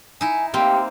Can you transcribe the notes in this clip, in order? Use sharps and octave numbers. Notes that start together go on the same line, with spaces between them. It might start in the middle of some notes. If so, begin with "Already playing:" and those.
D#4 E4 G#5
A2 A#3 C4 G4 G5 C6